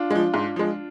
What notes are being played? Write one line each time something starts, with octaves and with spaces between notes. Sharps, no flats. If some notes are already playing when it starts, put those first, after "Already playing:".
Already playing: D4 F4
F3 G#3
G#2
F3 G#3